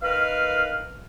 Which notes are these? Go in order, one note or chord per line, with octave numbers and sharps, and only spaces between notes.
D#3 A#4 B4 F5 F6